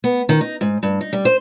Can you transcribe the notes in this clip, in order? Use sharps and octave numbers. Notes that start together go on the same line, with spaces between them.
B3
D#3
D#4
G#2
G2
D#4
G3
C5